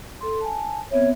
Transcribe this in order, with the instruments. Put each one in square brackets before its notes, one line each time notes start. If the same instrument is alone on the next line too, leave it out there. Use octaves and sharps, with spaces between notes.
[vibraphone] A4 C6
G#5 A5
[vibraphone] B3 C4 E5 [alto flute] C#5